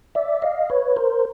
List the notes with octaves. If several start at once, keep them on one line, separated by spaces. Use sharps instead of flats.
D5 E5
D#5 F5
B4 C#5
A#4 C5